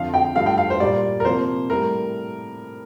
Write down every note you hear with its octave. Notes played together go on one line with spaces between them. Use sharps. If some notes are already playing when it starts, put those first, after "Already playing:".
Already playing: F2 D3 F3 F5
G5
G2 F3 A3 F5
G5
F5
C5
A#2 G3 A#3 D5
A#4
C3 F3 A#3 C5
A2 G3 A#4